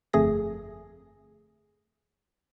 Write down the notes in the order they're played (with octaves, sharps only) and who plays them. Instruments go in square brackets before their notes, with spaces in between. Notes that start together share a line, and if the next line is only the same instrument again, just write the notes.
[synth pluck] G1 F2 A3 G#4 A#6